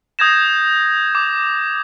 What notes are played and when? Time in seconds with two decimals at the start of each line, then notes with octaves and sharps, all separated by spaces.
0.19 D#6 G6 G#6 A#6 E7
1.15 D6